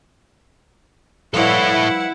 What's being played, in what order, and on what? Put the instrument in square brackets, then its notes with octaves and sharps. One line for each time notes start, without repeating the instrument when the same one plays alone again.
[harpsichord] G2 F3 [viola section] E4 [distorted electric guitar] A4 C#5 [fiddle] F#5